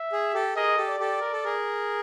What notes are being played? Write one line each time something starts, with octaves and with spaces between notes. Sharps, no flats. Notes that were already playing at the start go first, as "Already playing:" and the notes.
Already playing: E5
G#4
G4 A4
G#4 A#4 D#5
G4 A4
D5
G4 A4
A#4
A4
G#4 A#4